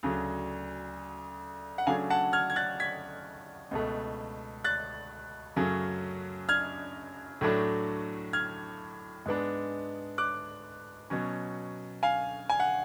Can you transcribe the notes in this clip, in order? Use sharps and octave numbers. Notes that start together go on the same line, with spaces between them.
D2 C#3 F#3
F#5
C#3 F#3 A3 D4 F5 G#5
F#5 A5
F6 G#6
G#6
F#6 A6
G#6 B6
C#2 B2 A3
F#6 A6
F#2 C#3 F#3 A3 C#4
F6 G#6
A2 F#3 A3 D4
F6 G#6
G#2 G#3 B3 D4
D6 F#6
B2 F#3 C#4
F5 G#5
G#5
F#5